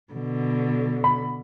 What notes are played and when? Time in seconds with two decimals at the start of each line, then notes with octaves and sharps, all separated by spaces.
0.13 B2 D3
1.04 B5